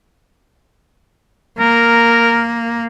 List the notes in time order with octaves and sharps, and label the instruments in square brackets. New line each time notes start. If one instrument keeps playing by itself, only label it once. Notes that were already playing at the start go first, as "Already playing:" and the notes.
[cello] A#3 [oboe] A#4